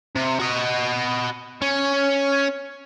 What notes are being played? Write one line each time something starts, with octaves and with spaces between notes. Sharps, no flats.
C3
F#4 D#5
C#4